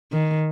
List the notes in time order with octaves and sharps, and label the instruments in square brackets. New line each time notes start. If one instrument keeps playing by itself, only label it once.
[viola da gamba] D#3